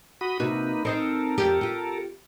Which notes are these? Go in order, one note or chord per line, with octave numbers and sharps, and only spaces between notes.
F#4 B5 D#6
C3 A#3 D#4 F#4 B4
C4 D#4 A4 A#4 C5
F2 F4 G4
F4 G4